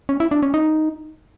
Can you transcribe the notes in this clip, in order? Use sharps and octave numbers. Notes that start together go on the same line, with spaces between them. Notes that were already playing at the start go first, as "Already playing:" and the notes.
C#4
E4
D4
C#4
D#4